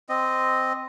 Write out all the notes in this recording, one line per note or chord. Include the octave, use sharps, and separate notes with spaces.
C4 D#5